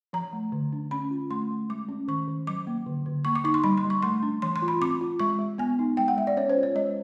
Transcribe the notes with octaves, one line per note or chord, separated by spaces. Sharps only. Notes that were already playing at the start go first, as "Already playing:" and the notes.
F3 A#5
A3
D3
D4
C#4 B5
F4
A3 C6
A3
G#3 D6
C#4
D#3 C#6
D#3
F#3 D6
A#3
D3
D3
A#3 C#6
D6
D#4 C#6
C6
G3 B5
C6
G3
C#6
A3 C6
D4
E3 C6
C6
F4
B5
C4 D6
F4
G#3 C#6
G#3
B3 G#5
D#4
G#3 G5
F#5
G#3 E5
D5
C#4 C#5
C5
F4
C#5
G#3 D#5